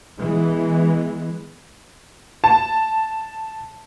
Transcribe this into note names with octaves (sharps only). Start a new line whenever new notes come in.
E3 G#3 B3
A5